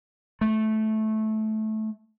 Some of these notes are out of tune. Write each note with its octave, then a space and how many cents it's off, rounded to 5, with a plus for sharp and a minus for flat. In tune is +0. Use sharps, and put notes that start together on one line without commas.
A3 -15